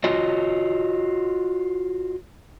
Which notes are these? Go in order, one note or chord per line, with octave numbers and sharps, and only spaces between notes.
F4 F#4 C#5 D#5